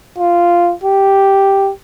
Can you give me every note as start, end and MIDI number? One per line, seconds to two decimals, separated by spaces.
0.18 0.73 65
0.84 1.71 67